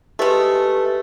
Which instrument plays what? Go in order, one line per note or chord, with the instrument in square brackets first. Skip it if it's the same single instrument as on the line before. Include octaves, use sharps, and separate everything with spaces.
[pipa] G#3 A3 [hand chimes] G4 B4 [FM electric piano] A4